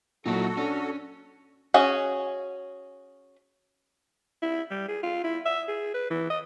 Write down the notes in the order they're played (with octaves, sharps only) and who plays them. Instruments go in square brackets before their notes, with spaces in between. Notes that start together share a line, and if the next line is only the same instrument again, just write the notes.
[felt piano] A#2 F#3 [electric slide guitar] D#4 E4 [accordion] F#4 A4
[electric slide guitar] C#4 [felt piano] D4
[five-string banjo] C#4 F#4 G#4
[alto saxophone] E4
G3
G#4
F4
E4
E5
G#4
B4
E3
D#5